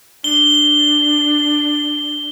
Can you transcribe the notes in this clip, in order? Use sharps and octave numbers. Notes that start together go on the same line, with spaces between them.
D4 G7